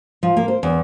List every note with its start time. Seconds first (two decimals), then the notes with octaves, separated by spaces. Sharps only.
0.23 F3
0.37 A#3
0.48 C5
0.63 E2